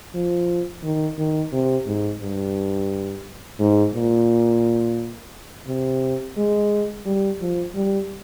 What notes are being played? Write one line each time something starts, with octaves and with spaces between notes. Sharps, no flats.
F3
D#3
D#3
C3
G#2
G2
G#2
A#2
C3
G#3
G3
F3
G3